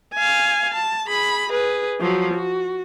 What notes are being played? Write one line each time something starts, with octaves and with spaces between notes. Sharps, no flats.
F5 G#5
A5
G#4 B5
G#4 B4
F3 F#3
F#4